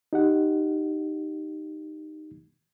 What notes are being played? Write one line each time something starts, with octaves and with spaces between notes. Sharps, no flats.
D#4 G4 F#5